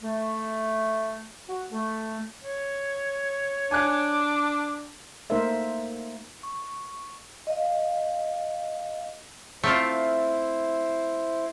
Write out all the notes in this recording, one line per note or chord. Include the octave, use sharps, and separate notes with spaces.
A3
F#4
A3
C#5
D4 G#5 D6 F#6
A3 A#3 D#4 A#4 C5 E5
C#6
D#5 F5
A3 C4 E4 F4 C5